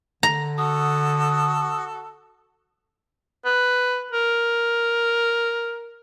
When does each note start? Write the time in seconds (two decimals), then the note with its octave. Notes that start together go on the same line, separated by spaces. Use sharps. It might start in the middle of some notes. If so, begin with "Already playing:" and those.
0.23 D3 A#5
0.58 F#4 A4 D#6
3.45 B4
4.11 A#4